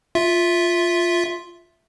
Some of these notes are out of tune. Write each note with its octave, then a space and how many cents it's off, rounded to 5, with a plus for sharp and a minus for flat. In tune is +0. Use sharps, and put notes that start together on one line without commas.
F4 +0 E5 +0